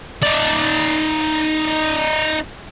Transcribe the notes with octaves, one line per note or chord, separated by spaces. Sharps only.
D#4 D5